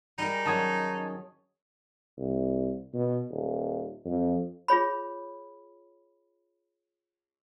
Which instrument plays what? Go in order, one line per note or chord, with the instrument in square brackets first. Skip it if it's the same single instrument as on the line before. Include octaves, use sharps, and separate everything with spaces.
[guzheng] G3 G#4 A#4 [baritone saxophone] D#4
[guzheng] D#3 F#3 C#4 [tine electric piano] A5 D#6 G#6
[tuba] C2
B2
D#1
F2
[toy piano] F4 G#4 C#5 B5